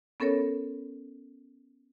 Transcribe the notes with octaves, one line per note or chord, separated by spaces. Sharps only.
B3 C#4 A4 A#4 C#5